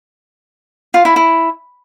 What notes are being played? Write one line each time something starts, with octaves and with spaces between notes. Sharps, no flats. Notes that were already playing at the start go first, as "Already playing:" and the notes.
F4
E4
E4